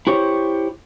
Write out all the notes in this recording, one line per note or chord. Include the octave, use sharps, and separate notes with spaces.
E4 G4 C5 C#5